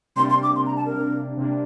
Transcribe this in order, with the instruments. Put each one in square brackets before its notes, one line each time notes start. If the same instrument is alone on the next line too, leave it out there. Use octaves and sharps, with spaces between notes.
[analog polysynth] C3 G3 A#3 D4 [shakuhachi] C6
[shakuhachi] C6
D6
[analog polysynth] C3 G3 A#3 D4 [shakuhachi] C6
[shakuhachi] A#5
A5
A#4
[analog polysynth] C3 G3 A#3 D4
C3 G3 A#3 D4